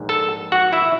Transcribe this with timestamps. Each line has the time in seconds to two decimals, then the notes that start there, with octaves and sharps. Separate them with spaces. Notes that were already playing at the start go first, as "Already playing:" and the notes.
Already playing: A#1 G#2
0.09 A4 A5
0.52 F#4 F#5
0.73 E4 E5